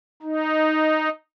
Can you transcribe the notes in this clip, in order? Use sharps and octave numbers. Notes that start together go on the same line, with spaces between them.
D#4